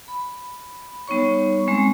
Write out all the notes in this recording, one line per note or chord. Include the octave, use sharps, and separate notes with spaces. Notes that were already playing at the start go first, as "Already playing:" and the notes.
B5
G3 B3 D#4 C#5 C#6
G3 G#3 C4 C#4